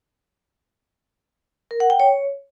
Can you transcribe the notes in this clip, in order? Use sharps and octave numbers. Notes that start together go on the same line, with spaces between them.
A#4
F#5
G5
C#5